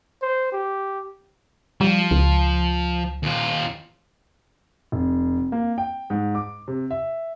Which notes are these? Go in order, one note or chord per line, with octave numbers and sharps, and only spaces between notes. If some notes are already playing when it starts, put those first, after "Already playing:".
C5
G4
F3 G3
C#2
D#2 F4
F1
A#3
G5
G#2
D6
C3
E5